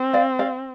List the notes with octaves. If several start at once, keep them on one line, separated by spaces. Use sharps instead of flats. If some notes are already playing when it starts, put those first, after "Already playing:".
Already playing: C4
D5 F5
D5 F5